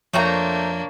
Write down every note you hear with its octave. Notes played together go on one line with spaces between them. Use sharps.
F2 F3 A3 A#3 D4 C5 C#5 A#5